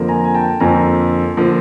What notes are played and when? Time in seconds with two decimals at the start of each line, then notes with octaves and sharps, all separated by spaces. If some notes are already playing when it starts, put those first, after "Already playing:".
Already playing: F2 D3 F3 A#3
0.08 G#5 A#5
0.24 G#5
0.34 G5 A5
0.60 F2 D3 F3 A#3 G#5 A#5
1.37 D3 F3 A#3